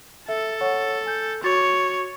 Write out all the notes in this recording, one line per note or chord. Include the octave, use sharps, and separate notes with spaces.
A4 E5
C#5 F#5 C#6
G#5 G6
F#4 C#5 D6 A6